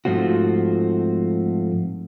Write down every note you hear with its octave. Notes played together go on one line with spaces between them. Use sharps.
G#2 F3 A3 C4 F#4